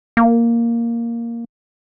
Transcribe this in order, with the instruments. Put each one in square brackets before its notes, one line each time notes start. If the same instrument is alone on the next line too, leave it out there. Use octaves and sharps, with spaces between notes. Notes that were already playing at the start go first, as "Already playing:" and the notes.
[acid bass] A#3